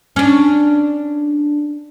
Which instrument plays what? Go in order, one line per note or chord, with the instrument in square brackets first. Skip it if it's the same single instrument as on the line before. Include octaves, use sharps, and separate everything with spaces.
[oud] C#4 D4